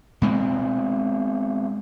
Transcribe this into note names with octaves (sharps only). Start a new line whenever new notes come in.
B2 G#3 C4